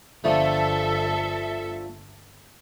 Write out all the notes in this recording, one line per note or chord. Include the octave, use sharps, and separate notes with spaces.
G1 D3 F3 A3 A4 E5